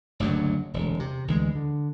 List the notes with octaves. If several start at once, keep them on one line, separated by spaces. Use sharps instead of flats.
F#1 D2 G2 F#3
E1 D2
C3
D2 E3 G3 G#3
D3